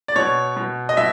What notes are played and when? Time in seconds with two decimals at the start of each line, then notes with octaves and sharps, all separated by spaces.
0.08 D5
0.16 B2 C#5
0.57 B2
0.89 D#5
0.97 B2 E5